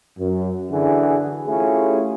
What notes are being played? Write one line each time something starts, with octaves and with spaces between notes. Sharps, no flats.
F#2
D3 E3 F#4 G#4
A3 C#4 E4 F4 G4 G#4